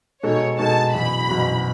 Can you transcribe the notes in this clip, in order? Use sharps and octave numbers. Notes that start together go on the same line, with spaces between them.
B2 G#3 D#4 A4 C#5
B2 G#3 D#4 A4 A5
F#1 E2 B2 B5
F#1 E2 B2